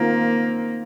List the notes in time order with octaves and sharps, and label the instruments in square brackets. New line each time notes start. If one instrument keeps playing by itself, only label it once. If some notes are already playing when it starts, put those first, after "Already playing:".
Already playing: [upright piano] D#3 C4 F4 A#4 [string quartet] A#3